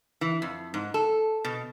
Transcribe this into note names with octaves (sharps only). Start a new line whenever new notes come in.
E3
F2
G#2
A4
B2